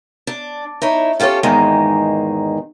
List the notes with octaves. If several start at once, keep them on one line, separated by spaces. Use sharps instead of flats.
D4
D#4 E4 C#5
C#4 F4 G4 A4 C#5
E2 G#2 D#3 G#3 A#3 D#4